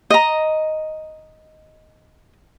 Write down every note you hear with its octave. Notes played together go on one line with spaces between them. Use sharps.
D#5 A#5